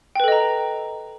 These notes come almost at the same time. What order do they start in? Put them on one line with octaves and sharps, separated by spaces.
G5 B4 A4 D#5 A#5